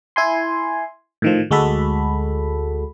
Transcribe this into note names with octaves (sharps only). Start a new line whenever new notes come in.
E4 G#5 C6
A2 D#3 F3
D2 G#3 F#4 A4 B5